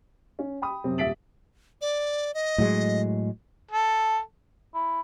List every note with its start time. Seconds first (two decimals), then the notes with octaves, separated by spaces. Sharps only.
0.39 C#4
0.62 G5 B5 D#6
0.84 F#2 C3 C4
0.98 D#1 E5 A6 B6 D7 F#7
1.81 D5
2.34 D#5
2.58 A2 F#3 G#3
3.71 A4
4.74 E4